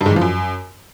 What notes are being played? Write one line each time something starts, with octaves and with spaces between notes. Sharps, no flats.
G2
G#2
E3
F3
F#2